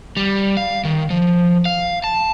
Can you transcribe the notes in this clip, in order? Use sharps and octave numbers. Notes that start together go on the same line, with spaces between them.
G3
F5
D#3
F3
F5
A5